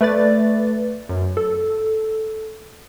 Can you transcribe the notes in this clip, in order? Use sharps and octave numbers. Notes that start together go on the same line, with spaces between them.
A3 B4 D5 A6
F#2 F#3
A4